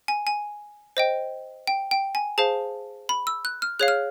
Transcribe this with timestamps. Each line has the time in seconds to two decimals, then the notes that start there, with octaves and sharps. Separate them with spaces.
0.08 G#5
0.27 G#5
0.97 C5 D#5 G5
1.67 G5
1.91 G5
2.15 G#5
2.38 G#4 C5 F5 A5
3.09 B5
3.27 E6
3.45 F#6
3.62 F6
3.79 G#4 C#5 F5 F#6
3.88 F6